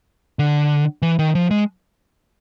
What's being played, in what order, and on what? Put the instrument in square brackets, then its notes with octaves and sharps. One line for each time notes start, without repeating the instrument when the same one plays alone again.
[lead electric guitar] D3
E3
D#3
F3
G#3